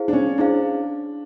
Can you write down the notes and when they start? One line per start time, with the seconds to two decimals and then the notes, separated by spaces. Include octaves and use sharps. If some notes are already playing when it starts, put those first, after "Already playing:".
Already playing: E4 G#4 C5 F5
0.08 D4
0.13 C#4
0.38 D4 E4 G#4 C5 F5